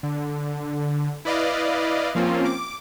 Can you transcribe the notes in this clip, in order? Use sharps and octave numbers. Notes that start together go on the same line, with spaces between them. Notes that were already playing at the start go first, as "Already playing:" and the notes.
D3
E4 B4 D5 D#5 F5
F3 A#3 C4 C#4 F4
D6